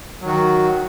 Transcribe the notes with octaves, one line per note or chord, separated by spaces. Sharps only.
D#3 F#3 F#4